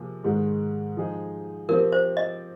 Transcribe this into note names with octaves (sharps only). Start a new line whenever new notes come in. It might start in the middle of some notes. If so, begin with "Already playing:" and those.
Already playing: C3 F3 A#3 F4 G#4
G#2 D#3 G#3 D#4
F3 G#3 D#4 G#4
F3 C4 G4 A#4
C5
D#5